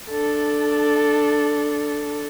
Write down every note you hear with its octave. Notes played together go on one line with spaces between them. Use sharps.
D4 A4